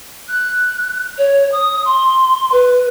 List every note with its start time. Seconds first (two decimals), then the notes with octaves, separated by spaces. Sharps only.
0.28 F#6
1.18 C#5
1.52 D#6
1.85 C6
2.52 B4